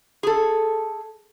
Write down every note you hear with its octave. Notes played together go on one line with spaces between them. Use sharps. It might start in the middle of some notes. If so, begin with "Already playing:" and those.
G#4 A4